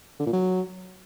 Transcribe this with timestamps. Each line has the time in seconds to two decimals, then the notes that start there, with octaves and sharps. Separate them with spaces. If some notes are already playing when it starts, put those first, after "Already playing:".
0.20 D3
0.26 A#2
0.33 F#3